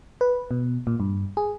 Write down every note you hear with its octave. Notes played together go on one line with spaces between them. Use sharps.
B4
B2
A#2
G2
G#4